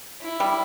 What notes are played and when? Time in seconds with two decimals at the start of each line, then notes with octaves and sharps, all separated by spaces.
0.22 E4
0.40 G3